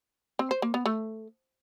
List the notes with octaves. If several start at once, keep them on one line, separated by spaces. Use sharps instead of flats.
C4
C5
A#3
B3
A3